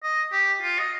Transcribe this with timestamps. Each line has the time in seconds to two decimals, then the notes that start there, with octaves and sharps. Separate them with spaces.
0.03 D#5
0.32 G4
0.62 F4
0.79 D#5